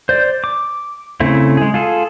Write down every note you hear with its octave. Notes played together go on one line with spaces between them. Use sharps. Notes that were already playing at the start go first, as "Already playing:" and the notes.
C5 D5
D6
C#3 A3 C4 E4
G#3 G#4
F4 G#4 A4